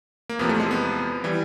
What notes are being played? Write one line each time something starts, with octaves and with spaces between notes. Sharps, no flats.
A#3
E2 C3 F3 B3
A3
G#3
B3
E3 G3